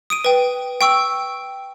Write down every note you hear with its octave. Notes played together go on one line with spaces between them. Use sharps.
D#6 D7 D#7
B4 G5
G5 C#6 E6